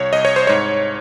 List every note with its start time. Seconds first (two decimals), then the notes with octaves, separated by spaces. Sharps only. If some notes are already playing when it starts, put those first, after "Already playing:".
Already playing: C2 C#5
0.13 C2 D#5
0.25 C#5
0.36 C5
0.47 G#2 C#5